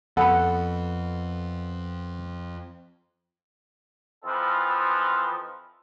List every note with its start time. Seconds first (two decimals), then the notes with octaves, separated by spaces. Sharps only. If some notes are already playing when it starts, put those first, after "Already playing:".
0.17 F2 B3 A4 B4 F#5
4.24 E3 F3 C4 D#4 A4 B4